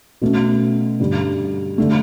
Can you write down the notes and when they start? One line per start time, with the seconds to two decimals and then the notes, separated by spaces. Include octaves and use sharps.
0.22 B2 A3 C#4
1.00 G2 D3 G3
1.78 D3 A3